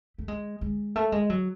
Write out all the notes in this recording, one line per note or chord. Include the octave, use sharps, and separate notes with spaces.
A3
G#3
G#3
A3
G#3
F#3